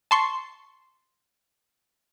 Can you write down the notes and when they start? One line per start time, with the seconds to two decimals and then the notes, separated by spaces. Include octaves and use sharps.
0.11 A5 C6 C#6